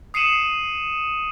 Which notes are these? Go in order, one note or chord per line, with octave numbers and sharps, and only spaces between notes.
D#6 C7 C#7 D#7 E7 F#7